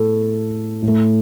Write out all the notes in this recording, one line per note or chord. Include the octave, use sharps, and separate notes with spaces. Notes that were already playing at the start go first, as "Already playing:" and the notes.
Already playing: A2 A3 A4
A2
A3